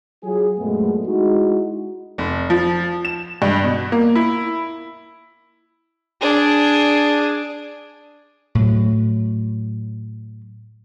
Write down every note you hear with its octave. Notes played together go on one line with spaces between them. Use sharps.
F#3 F4 G#4
F#2 A#2 G#3 A3 B3
G#3 D#4 E4 F#4
F1
F3
E7
G2
B2
A#3
E4
D4 G#4
A2 F#3